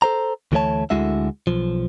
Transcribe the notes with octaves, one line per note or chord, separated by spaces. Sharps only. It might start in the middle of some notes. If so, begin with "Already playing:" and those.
A4 C5 A#5
D2 E3 A3 E4 C#5 A5
D2 D3 G#3 E4 F#4 E5
B1 F3